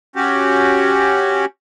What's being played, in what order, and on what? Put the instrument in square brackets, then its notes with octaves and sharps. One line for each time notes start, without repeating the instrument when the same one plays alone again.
[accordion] C#4 F#4 G4